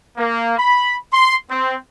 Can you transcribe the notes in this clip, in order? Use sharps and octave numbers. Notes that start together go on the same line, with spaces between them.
A#3
B5
C6
C4